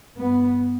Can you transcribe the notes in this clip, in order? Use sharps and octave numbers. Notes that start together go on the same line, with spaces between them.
G2 B3